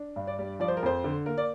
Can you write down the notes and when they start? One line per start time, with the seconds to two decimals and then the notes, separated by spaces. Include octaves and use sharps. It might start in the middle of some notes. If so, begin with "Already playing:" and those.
Already playing: D4
0.16 G2
0.27 D5
0.39 G3
0.60 F3 D5
0.68 C5
0.77 A#4
0.83 F2 C5
1.04 D3
1.26 A#3 A#4
1.38 D5